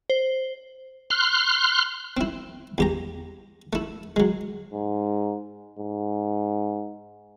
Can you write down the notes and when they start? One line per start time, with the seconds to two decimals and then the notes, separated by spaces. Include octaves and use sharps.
0.10 C5
1.10 C6 F6 F#6
2.17 C4 E4
2.78 E2 G4 A#5
3.73 A3 E4
4.16 F#3 G#3
4.74 G#2
5.79 G#2